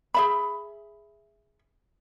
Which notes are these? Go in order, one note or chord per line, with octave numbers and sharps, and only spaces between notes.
G#4 E5 B5